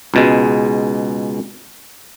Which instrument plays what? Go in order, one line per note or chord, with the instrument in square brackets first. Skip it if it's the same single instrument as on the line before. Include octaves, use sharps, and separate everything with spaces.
[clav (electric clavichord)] C#2 B2 G#3